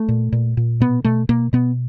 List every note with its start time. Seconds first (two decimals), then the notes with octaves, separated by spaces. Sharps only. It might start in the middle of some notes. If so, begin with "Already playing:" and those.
Already playing: A3
0.08 A#2
0.32 A#2
0.57 A#2
0.80 B2 B3
1.04 B2 A3
1.29 B2 A#3
1.53 B2 B3